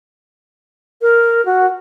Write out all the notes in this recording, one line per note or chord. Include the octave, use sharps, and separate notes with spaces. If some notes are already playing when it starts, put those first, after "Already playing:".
A#4
F#4